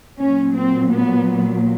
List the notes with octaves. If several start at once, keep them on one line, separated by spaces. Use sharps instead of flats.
A#2 F#3 C#4
C4
B3